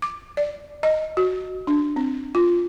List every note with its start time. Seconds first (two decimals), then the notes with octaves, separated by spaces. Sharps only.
0.02 D6
0.37 D5
0.83 D#5
1.17 F#4
1.67 D4
1.96 C4
2.35 F4